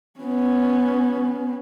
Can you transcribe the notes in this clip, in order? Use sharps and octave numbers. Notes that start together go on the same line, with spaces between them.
B3 C#4